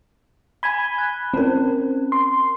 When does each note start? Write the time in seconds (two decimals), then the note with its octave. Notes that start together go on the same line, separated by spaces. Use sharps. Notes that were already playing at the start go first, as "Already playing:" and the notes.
0.63 G#5 B5 G#6 D#7 G7
0.98 F#6
1.34 C4 C#4 A#4
2.12 C6